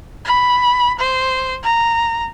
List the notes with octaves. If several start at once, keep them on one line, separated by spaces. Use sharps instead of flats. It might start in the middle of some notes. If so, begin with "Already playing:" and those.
B5
C5
A#5